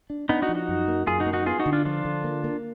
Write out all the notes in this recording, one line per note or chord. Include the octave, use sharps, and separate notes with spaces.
D4
B3 D4 D#4
D#4 F#4
F3
D#4 F#4
F#2
A#3
F#2 F4 G#4
D#4 F#4
A#3
D#4 F#4
B3 F4 G#4
D#4 F#4
D3
D4 F4
F3 D4 F4
D3
A#3
A#3